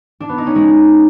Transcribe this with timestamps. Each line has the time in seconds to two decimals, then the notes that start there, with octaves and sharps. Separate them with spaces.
0.20 D4
0.29 B3
0.38 D#4
0.47 C#4
0.55 G#3